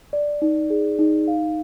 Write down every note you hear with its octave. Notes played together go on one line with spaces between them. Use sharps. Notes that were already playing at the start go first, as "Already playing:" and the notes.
D5
D#4
G#4
D#4
F5